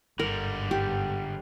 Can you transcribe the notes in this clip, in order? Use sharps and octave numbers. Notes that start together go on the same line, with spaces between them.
G1 G#2 D3 G3 A#4
G4